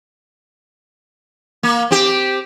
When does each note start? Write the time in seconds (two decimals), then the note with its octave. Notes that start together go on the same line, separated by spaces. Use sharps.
1.63 A#3
1.91 C4 G4